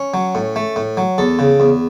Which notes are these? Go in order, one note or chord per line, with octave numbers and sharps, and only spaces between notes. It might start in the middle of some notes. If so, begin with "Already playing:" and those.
Already playing: C#4
F#3
A2
A3
A2
F#3
E2 A4
C#3
E2